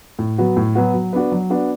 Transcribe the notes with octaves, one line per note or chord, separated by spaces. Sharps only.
A2
F#3 B3 F#4
A2
F#3 B3 F#4
F#3
B3 D4 F#4
F#3
B3 D4 F#4